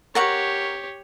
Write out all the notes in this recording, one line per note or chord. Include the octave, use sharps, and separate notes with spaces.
G4 A#4 C#5 F#5 C#6